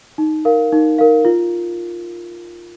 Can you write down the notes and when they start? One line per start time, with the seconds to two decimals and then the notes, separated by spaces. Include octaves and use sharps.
0.18 D#4
0.45 A#4 F5
0.72 D#4
0.99 A#4 F5
1.25 F4